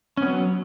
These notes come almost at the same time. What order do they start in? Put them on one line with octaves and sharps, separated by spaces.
C#4 B3 F#3